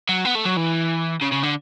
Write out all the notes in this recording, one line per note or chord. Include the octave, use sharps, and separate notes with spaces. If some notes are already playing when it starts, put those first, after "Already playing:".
F#3
B3
A3
F#3
E3
C#3
C#3
D3